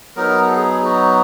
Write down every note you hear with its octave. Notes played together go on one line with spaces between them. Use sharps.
F#3 B3 D#4 A#4
A4
G#4
F#4